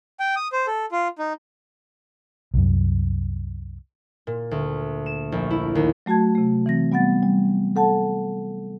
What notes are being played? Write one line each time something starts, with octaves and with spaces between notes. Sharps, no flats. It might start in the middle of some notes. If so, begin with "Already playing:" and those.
G5
D#6
C5
A4
F4
D#4
C2 F#2
A#2
D2
E7
A#1
E4
D#2
F#3 A3 F#4 A5 G#6
C3 A3
E3 C4 A#6
G3 B3 F#5 A6
G3
A4 F#5 A5